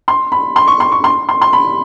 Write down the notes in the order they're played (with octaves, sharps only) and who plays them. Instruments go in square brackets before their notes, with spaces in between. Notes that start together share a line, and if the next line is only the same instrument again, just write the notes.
[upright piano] C6
B5
C6
C#6
C6
C#6
C6
C6
C6
B5